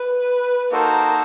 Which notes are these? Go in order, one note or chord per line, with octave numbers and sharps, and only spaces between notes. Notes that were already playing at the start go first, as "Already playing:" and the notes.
Already playing: B4
A#3 D#4 F#4 A4 A#4 C5